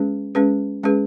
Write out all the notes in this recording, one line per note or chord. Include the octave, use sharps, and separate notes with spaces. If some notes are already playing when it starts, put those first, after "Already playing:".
Already playing: G#3 C#4 G#4 B4
G#3 C#4 G#4 B4
G#3 C#4 G#4 B4